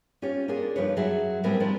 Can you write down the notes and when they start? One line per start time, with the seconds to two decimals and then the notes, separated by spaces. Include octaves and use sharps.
0.22 C#4 F4 G4 C#5
0.48 A#3 D4 F4 G#4
0.76 G2 F3 D#4 B4 C#5
0.96 F#2 F#3 G#4 E5
1.43 A2 G3 G#3 A#3 C4 B4
1.60 D#3 F3 G3 A#3 D4 F4